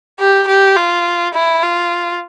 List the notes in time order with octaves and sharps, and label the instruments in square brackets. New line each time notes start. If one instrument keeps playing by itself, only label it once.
[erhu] G4
G4
F4
E4
F4